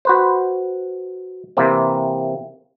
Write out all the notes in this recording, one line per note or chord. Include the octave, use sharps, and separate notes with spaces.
F#4 B4 C5
C3 E3 A#3 C4